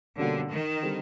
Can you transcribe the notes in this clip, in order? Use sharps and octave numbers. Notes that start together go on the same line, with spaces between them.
B2 D3 G3 A#3 C#4 F#4
D#3
D3 G3 C4